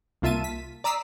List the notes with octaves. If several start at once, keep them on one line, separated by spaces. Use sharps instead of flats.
C2 A#3 F4 E5 A5 D#7
B6
D5 A#5 D#6 E6 B6 C7